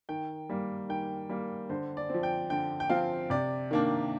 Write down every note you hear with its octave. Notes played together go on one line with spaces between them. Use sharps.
D#3 G5
G3 A#3
D#3 G5
G3 A#3
D3 C5
D5
F3 C4
G5
D3 G5
G5
F3 C4 F5
C3 D5
D#3 A#3 D4